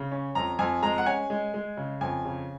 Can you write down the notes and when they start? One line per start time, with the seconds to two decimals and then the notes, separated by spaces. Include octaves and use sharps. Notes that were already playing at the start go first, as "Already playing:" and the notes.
Already playing: C#3
0.11 C#4
0.35 F2 A#5
0.59 F2 G#5
0.83 G#3 A#5
0.98 F#5
1.06 C#4 G#5
1.30 G#3
1.54 G#3
1.77 C#3
2.01 F2 G#5
2.25 C#3